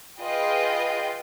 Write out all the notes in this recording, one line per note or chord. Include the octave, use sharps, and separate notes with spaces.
F4 G#4 B4 D#5 G5